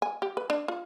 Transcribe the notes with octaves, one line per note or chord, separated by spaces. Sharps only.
G#5
G4
B4
D4
F4